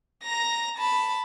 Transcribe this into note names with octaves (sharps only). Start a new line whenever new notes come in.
A#5 A#6
A5 B5